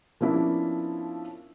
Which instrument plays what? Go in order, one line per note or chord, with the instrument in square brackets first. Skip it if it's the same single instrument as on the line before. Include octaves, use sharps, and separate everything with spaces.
[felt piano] F3 A#3 B3 C#4 D4 E4